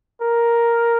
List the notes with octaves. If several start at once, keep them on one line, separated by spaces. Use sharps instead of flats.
A#4